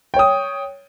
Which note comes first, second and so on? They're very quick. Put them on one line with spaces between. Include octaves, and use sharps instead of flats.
G5 C#5 D#6